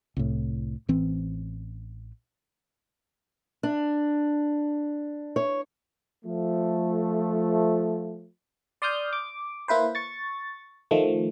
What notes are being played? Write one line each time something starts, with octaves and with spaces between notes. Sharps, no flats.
C2 A2
A1 E3 C4
D4
C#5
F3 A3
D5 C6 D#6 F6 G6
D6
A#3 E4 B4 C5
C#6 A6
D#3 F3 A3